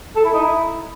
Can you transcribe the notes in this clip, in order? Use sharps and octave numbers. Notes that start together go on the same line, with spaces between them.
A4
E4
D#4
E4